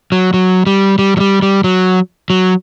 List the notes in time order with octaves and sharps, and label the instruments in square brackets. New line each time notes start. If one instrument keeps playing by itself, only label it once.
[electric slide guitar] F#3
F#3
G3
G3
F#3
G3
G3
F#3
F#3